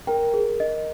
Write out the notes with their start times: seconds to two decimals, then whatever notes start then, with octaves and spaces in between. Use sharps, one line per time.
0.07 A#4 G5
0.33 G#4
0.60 D#5